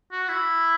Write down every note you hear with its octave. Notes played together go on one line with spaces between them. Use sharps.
F#4
E4